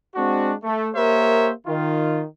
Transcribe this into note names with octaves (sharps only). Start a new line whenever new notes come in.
G#3 C4 D4 F#4
A3
A#3 G4 A#4 C5 C#5 E5
D#3 F4